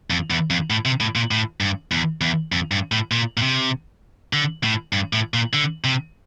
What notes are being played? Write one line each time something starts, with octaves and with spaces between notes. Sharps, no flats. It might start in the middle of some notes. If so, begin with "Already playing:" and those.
F2
E2
F2
A2
C3
A2
A#2
A2
G2
E2
E2
F2
G2
A2
A#2
A#2
C3
D3
A2
G2
A2
A#2
D3
C3